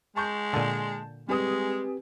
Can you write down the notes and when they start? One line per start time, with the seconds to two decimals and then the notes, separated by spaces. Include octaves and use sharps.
0.16 G#3 A5 C#6 G6
0.53 A#2 D3 A5
1.29 G3 G#3 C4 G4 B4 G#5 D#6